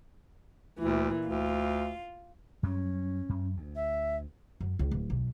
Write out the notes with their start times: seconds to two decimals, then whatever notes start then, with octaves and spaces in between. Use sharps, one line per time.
0.79 D2 A#2 E3
1.28 D2 F4
2.63 F#2 F#3 G3 C#4
3.29 F#2
3.57 D2
3.75 E5
4.61 F#2
4.79 C#2
4.91 D1
5.10 B1